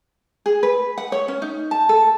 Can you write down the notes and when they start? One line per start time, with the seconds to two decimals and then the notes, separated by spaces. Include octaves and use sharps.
0.46 G#4
0.63 B4
0.98 F#5
1.12 C#5
1.28 C#4
1.42 D#4
1.71 A5
1.89 A4